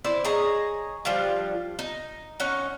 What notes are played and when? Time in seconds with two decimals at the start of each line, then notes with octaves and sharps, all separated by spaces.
0.04 E4 C5 D5
0.25 G#4 C#5 D#5 A#5
1.05 F3 G3 D4 F4
1.79 D#4
2.40 C#4 D#4 F#5